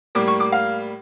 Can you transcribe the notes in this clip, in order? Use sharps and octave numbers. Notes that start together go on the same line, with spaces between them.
A2 G3 A#3 D6
C#6
D6
F5